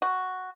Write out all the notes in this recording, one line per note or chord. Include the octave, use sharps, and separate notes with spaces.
F#4